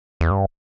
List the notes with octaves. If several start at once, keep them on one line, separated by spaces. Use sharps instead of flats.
E2
G2